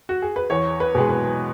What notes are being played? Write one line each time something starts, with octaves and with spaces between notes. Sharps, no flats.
F#4
G#4
B4
E2 C#5
B4
B2 G#3 G#4
B4